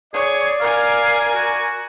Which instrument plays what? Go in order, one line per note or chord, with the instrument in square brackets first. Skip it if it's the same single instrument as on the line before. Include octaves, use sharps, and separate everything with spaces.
[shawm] G#4 [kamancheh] C#5 [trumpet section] D5
[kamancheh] A#4 G#5 [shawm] F5
[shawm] F#4